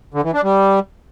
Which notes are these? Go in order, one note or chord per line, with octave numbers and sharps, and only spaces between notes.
D3
E3
D4
G3